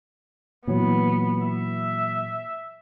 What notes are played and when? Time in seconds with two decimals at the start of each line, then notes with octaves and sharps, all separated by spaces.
0.67 A#2 E3 F#3 B3
1.46 E5